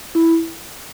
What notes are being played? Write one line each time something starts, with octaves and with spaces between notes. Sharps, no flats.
E4